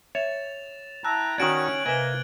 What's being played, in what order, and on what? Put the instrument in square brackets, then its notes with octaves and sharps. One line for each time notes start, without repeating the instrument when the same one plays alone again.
[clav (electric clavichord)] C#5 [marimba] E5 [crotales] A6 E7 F7
[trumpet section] E4 G5 A#5 [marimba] A5 E6 [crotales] F#6
[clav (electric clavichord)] D#3 F#4 D5 [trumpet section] C#4 [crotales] G#6 D7 F#7
[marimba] C3 B4 G#5 [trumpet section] A#3 [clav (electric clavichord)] D#5 E5 [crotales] G#6 G7